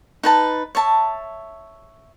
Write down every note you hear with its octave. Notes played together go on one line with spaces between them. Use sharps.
D#4 B4 A5
C#5 E5 A5